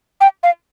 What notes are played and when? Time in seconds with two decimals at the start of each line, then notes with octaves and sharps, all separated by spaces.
0.21 G5
0.43 F5